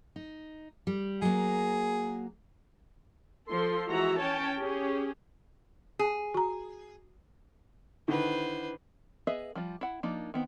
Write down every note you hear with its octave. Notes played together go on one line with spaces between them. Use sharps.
D#4
G3
F#3 A#3 G#4
F3 A4 C6
E3 G#3 F#4 E5 A#5
C#4 C#5 G5 A5
C#4 G4 G#4
G#4
F#4 A#5
D3 D#3 E4 B4 C5 F#5
B3 G#4 B4 D#5 E5
F3 G3 F4
E4 F#5
F3 A#3 D4 D#4
D#3 B3 C4